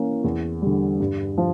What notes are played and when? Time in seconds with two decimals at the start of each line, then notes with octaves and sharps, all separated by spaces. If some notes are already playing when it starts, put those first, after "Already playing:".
Already playing: E3 A#3 C#4
0.24 E2
0.62 D3 G3
1.00 G2
1.38 F3